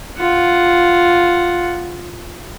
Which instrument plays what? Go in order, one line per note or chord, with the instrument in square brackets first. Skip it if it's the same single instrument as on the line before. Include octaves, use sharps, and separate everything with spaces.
[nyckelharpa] F4 F#5